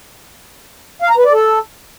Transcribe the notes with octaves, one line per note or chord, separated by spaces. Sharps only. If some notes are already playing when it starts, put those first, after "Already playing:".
F5
A#5
B4
D5
A4